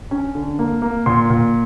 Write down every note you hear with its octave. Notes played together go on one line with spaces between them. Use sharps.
C#4
D3
A#3
A#3
A#2 C6
A#2